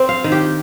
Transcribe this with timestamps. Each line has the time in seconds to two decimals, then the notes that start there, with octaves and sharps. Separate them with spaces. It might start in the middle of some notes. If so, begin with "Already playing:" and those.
Already playing: C4
0.09 F5
0.24 D#3
0.32 G4